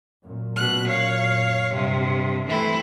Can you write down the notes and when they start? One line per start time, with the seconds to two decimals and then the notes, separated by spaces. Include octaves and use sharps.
0.23 F#2 A#2
0.57 B2 F#6
0.88 C#5 F5
1.74 G2 C3
2.47 E3 A3 C4 E4